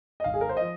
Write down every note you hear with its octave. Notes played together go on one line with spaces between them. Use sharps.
D#5
G#1 F5
G#4
A#4
C5
F3 D#5